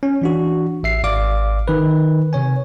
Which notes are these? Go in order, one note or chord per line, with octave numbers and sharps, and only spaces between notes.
C#4
E3 D4 F#4
A1 E5 C7
G#1 D5 F5 D6
D#3 B4
C3 C#5 G#5